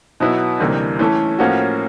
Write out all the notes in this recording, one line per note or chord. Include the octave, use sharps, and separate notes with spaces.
B2 F#3 B3 E4
D2 C3 E3 G3 A#3
E3 A3 C#4 E4 A4
A2 F3 A#3 C#4 F#4